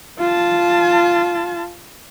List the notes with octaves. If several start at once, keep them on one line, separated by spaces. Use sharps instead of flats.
F4 A5